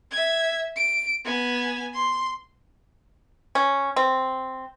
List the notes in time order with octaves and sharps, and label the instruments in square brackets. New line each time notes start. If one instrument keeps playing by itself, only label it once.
[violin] E5 G#6
D7
B3 G#5
C6
[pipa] C#4
C4